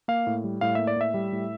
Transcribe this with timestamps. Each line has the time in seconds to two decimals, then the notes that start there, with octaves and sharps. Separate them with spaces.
0.08 A#3 F5
0.27 A2
0.44 G3
0.61 A2 F5
0.75 A#3 E5
0.87 D5
0.96 A2 E5
1.14 G3
1.32 A2